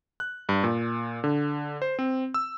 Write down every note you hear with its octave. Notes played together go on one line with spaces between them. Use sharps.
F#6
G2
A#2
D3
C5
C4
E6